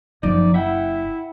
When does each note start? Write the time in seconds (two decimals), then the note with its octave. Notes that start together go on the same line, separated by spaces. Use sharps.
0.23 F#1 F3 D#4 D5
0.54 E4 E5 F#5 G5